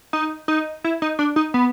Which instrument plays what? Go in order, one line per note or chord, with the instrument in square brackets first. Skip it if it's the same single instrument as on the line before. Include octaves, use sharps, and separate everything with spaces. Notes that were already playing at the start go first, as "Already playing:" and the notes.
[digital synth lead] D#4
D#4
E4
D#4
D4
D#4
B3